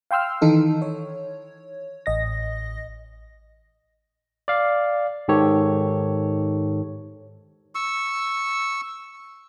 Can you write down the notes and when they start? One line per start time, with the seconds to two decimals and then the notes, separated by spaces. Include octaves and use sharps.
0.11 F5 G5 C6 E6 F6
0.42 D#3 E3 D#4 A4
0.82 C#5
2.06 A1 D#5 A#6
4.48 D5 F5
5.28 G#2 D#3 G4 A4 C#5
7.75 C#6 E6